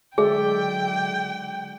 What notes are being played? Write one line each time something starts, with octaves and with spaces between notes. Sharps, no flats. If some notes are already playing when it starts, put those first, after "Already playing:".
D3 F#3 G#3 G#4 D5 E5 G5